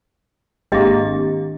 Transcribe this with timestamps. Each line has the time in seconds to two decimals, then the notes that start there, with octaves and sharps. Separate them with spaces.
0.72 G#1 A#3 D4 G4 D#5